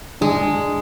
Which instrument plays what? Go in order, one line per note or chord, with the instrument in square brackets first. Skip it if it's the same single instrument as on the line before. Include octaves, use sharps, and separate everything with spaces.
[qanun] G#3 [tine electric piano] D4